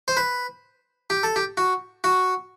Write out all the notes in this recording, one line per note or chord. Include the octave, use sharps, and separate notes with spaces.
C5
B4
G4
A4
G4
F#4
F#4